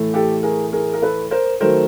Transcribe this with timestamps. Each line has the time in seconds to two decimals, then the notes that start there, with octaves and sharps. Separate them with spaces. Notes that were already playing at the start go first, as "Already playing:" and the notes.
Already playing: A2 E3 A3
0.14 G4 A4
0.43 G#4 A#4
0.72 G#4 A#4
0.93 A#4
1.02 A4 B4
1.31 A#4 C5
1.60 D#3 F#3 A3 A#4 C5